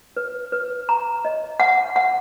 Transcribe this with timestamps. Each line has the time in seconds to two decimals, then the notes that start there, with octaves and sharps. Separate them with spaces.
0.17 B4
0.52 B4
0.89 A#5
1.25 D#5
1.60 F#5
1.96 F#5